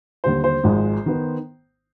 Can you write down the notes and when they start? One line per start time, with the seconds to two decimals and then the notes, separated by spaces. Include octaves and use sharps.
0.24 D#2 D3 G3 C5
0.44 C5
0.64 G#1 G#2 F3 G#3
1.06 D#3 B3